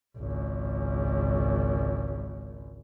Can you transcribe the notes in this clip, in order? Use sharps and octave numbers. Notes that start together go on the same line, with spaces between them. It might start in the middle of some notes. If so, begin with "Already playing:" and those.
G#1 C#2